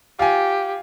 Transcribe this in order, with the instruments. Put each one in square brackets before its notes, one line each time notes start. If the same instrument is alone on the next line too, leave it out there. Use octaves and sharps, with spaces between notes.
[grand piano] F4 G#5 [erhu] G4